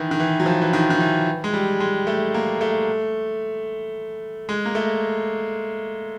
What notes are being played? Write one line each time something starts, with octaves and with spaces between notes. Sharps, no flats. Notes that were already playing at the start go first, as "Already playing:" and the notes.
Already playing: D#3 E3
D#3
E3
F#3
F3
E3
D#3
D#3
E3
G#3
G3
G#3
A3
A#3
A3
G#3
A#3
A3